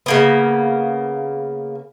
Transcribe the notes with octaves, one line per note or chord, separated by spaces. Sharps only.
C#3 A#3 B3